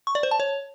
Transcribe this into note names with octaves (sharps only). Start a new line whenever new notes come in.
C#6
D5
C5
A5
C#5